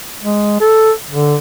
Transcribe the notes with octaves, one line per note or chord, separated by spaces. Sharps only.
G#3
A4
D3